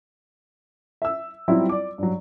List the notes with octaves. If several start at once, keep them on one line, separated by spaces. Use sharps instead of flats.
E5 E6
F#3 G3 C4 E4 F4
D5 D6
G2 F#3